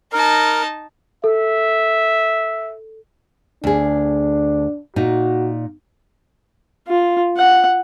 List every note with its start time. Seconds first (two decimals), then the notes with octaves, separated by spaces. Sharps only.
0.13 D#4 A#4 A5
1.24 A4 E5
3.64 D2 D4 G#4
4.96 A#2 D#4 F#4
6.87 F4
7.37 F#5